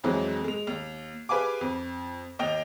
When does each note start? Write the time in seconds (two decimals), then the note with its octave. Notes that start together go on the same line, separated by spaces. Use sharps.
0.04 F2 E3 F#3 G#3
0.44 G#3 F7
0.67 D#2
1.29 G4 G#4 B4 F5 G#5 D6
1.61 F2
2.39 D#2 D#5 G5 F7